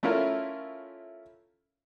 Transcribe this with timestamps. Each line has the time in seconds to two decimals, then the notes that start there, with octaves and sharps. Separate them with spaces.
0.03 A3 C#4 E4 F4 A#4